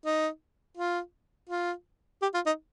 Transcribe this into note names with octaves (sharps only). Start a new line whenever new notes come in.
D#4
F4
F4
G4
F4
D#4